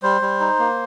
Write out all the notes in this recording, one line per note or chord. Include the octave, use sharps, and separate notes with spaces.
G3 C5
G3
D#4
A#3